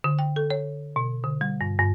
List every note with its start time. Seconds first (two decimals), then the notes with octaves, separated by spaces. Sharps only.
0.04 D3
0.19 G5
0.36 A4
0.50 C#5
0.96 B2
1.24 D3
1.41 G3
1.61 G2
1.79 G2